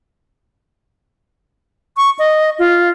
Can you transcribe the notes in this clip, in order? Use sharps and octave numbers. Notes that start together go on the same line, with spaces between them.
C#6
D#5
F4